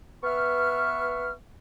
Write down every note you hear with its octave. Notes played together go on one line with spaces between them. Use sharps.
B3 B4 E5 C#6 F6